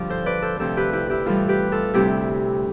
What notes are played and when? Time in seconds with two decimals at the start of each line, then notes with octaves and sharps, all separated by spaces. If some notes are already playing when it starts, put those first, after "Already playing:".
Already playing: G2 D3 F3 F4 G4 D5
0.09 A4 C5
0.26 B4 D5
0.42 A4 C5
0.59 D2 C3 F3 A4 C5
0.77 G4 B4
0.92 E4 G4
1.10 E4 G4
1.26 A2 E3 G3 F4 A4
1.49 G4 B4
1.72 F4 A4
1.93 D2 C3 G3 E4 G4